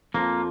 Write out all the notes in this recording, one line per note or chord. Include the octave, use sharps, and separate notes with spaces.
F2 F3 A#3